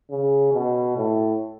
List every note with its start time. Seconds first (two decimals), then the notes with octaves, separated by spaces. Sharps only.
0.10 C#3
0.54 B2
0.97 A2